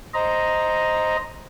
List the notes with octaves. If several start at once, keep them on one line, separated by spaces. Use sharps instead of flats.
C5 D#5 A#5